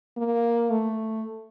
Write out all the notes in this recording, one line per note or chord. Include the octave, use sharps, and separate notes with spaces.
A#3
A3